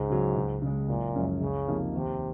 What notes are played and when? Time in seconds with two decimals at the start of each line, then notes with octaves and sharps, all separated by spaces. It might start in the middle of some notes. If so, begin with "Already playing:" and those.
Already playing: C#2 G#2
0.10 C#3 F#3
0.36 C#2
0.62 C#3 G#3
0.88 F#1 A#2
1.15 F#2 F3 G#3 C#4
1.41 C#2 C#3
1.67 C3 F3 A#3 D#4
1.94 D#2 C3